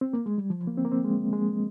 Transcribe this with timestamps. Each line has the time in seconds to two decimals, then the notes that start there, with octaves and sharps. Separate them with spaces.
0.01 C4
0.13 A#3
0.26 G#3
0.38 G3
0.50 F3
0.67 A#3
0.77 C4
0.85 A#3
0.92 C4
1.05 G#3
1.33 G#3